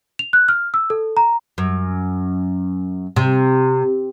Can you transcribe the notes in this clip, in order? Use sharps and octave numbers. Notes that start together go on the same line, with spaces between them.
F7
F#6
F6
E6
A4
A#5
F#2
C3